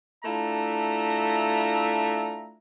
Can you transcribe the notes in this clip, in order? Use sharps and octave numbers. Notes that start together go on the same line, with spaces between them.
A3 D4 E4 F4 E5 A#5